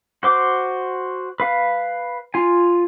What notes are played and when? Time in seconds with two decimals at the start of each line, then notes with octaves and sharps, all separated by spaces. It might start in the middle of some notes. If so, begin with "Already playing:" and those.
0.23 F#4 C5 D6
1.40 B4 F5
2.34 F4 G#5